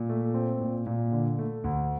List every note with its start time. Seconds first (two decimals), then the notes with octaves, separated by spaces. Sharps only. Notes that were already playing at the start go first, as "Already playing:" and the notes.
Already playing: A#2
0.09 A3
0.34 C4
0.61 A#2
0.86 A#2
1.12 D3
1.39 A3
1.64 D2